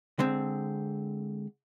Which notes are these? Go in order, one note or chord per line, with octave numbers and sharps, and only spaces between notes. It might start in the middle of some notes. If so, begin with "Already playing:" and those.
D3 G#3 C4